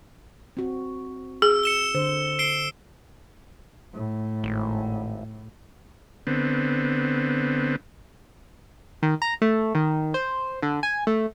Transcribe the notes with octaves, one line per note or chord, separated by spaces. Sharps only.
C4 F#4
G#4 E6
C#7 E7 G7
D3 C5
C7 D7 G7
A2
G#1
D3 B3 C4
D#3
A#5
A3
D#3
C5
D3
G#5
A3